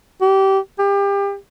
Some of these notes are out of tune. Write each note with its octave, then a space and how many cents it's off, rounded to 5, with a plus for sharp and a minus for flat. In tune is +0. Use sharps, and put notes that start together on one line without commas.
G4 -20
G4 +30